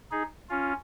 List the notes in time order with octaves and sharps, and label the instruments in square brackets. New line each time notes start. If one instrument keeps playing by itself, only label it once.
[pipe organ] D#4 G#4
C#4 F4